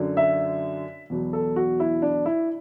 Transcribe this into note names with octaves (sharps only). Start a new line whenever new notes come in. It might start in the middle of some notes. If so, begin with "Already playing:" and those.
Already playing: F#2 D3 F#3
E5
E2 B2 F#3
A4
F#4
E4
D4
E4